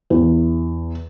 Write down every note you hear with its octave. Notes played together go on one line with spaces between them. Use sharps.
E2